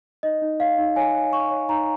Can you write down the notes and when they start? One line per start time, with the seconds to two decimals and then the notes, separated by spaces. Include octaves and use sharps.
0.23 D#4 D#5
0.42 D#4
0.59 C#5 F5
0.78 D#4
0.96 C#5 G#5
1.14 C#5
1.32 C#5 C#6
1.51 C#5
1.69 D#4 A#5